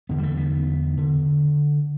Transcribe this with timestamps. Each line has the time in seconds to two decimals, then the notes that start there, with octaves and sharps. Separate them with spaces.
0.09 E2 D3 B3
0.18 G3
0.23 A3
0.37 B3
0.98 D3